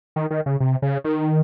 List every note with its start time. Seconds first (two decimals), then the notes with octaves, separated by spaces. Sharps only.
0.16 D#3
0.30 D#3
0.46 C#3
0.60 C3
0.82 C#3
1.04 D#3